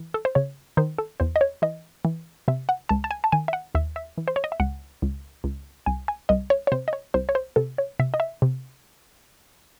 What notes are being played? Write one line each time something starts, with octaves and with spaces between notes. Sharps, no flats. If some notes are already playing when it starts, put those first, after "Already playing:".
Already playing: E3
A4
C5
C#3 C#5
D#3 C5
A4
E2 C5
D#5
C#5
E3 D#5
E3
C3 E5
F#5
C#2 A5
A5
G#5
A5
D#3 G#5
E5
F#5
D#2 E5
E5
E3
C5
C#5
D#5
E5
C#2 F#5
C#2
C#2
C2 G#5
G#5
C2 D#5
C#5
C#5
C3 C5
D#5
C#5
C2 C5
C#5
C5
C3 A4
C#5
C3 E5
D#5
E5
C3